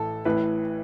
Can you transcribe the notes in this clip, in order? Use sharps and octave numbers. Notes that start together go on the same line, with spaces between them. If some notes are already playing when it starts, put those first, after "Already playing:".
Already playing: A1 A2 E3 A4
A1 A2 E3 B4